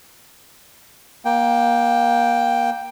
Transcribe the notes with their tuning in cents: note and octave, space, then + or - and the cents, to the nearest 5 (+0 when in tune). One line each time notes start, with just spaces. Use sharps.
A#3 +25 G5 +0